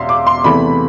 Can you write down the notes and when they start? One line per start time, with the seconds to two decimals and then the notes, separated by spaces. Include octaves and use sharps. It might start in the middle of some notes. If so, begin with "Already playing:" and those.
Already playing: E1 E2 E5 F5 C6
0.09 D6
0.27 C6
0.44 E2 C3 E3 A3 B5